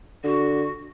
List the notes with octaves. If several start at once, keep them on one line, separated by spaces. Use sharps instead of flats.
D3 F#4